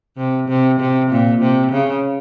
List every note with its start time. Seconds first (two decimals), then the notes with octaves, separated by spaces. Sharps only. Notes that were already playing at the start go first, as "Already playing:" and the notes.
0.17 C3
0.49 C3
0.80 C3
1.11 A#2
1.42 C3
1.72 C#3